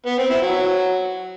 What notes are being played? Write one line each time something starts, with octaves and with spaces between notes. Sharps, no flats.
B3
C4
E4
F#3